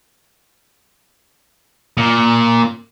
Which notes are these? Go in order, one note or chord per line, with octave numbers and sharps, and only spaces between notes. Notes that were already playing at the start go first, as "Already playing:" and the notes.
A#2